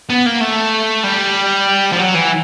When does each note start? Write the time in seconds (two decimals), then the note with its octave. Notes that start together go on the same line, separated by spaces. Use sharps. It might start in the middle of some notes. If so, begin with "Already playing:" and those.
0.10 B3
0.26 A#3
0.41 A3
1.04 G3
1.92 F3
1.99 F#3
2.14 E3